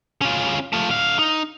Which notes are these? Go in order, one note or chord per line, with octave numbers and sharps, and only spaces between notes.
C#4 F4
A3 F4
D3 F5
D#4